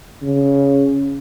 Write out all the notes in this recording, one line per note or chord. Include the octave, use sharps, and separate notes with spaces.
C#3